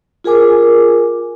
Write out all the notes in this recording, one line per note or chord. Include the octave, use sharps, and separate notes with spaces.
F4 G#4 A#4 G#5 D6